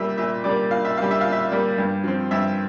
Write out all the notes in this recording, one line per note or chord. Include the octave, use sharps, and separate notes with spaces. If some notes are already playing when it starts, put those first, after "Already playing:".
Already playing: A#2 G3 A#3 E5
A#2 E5
G3 A#3 D5
A#2 F5
E5
G3 A#3 F5
E5
A#2 F5
E5
G3 A#3
G2
F3 C4
G2 E5